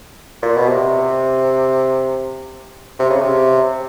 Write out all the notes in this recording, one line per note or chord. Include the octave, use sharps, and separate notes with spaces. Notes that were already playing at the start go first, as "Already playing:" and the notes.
A#2
B2
C3
C3
C#3
C3